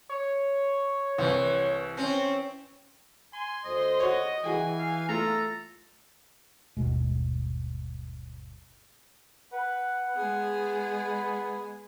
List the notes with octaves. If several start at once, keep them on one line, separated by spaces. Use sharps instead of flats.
C#5
C2 E3
C4 C#4
G#5 C6
D2 C5 D#5
F#4 C#5
E3 F#4 G#4 G5 G#5
F5
A3 F4 A4 A#5
G1 D#2 B2 G#3
B4 F#5
G#3 B3 G#4
B5